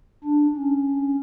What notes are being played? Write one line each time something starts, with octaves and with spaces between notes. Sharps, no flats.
D4
C#4